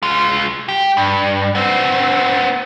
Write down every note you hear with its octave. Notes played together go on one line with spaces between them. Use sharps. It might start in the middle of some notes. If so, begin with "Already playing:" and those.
G#3 F4
G4
G2
B3 C4